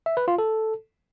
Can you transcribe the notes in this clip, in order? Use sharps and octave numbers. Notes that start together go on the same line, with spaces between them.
E5
B4
F4
A4